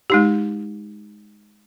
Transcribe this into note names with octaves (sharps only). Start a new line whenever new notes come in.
G#3 D#4 G4